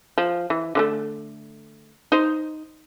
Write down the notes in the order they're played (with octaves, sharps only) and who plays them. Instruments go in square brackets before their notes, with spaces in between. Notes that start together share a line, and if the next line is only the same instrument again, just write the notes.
[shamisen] F3
E3
D3 F#3 A3
D#4 C5